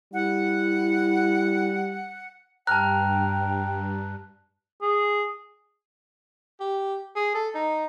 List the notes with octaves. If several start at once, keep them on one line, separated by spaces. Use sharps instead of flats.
G3 E4 F#5
G2 G5 A5 A#5 F6 F#6
G#4
G4
G#4
A4
D#4